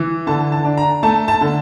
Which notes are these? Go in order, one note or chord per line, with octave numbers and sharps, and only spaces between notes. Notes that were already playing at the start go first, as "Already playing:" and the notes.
Already playing: E3
D3 A5
A5
D4
A#5
A3 A5
A5
D3